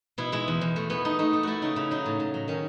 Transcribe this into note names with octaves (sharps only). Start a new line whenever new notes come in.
B2 E4
G#3 E4
E2
E2
A3
E3 B3
A3 D#4
A3 D#4
A3
A3 E4 F#4
C#3 D#4
C#3 E4
F#3 D#4
A2
A2
F#3
D#3 C#4